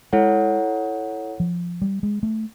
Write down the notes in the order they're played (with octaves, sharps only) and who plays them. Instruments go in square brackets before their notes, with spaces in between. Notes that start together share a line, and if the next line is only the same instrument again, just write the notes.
[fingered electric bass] G#3 [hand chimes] E4 A4 C#5 F#5
[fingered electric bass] F3
G3
G#3
A3